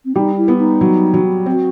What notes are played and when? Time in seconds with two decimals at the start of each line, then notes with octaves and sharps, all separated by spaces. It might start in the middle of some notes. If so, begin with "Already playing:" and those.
0.05 C4
0.15 G3 D#4
0.37 E4
0.48 B3
0.59 D#4
0.81 F#3
1.14 F#3
1.46 C4 F#4